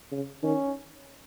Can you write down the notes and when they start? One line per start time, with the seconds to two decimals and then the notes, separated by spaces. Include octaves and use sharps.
0.12 C#3
0.43 D#3 C#4